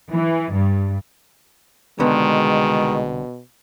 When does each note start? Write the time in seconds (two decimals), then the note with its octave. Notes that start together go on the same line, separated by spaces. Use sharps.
0.11 E3
0.53 G2
1.99 C2 B2 D3 D#3 G#3 B3